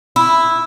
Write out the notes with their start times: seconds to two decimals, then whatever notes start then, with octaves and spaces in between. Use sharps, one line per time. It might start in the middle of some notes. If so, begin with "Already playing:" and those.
0.16 E4